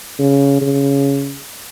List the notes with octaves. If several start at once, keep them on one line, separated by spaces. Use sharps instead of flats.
C#3
C#3